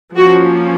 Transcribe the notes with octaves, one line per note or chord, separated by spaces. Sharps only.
F3 A#3 C#4 F#4